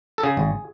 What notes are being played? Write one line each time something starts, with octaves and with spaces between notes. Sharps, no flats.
A4
C#3 G#4
G#1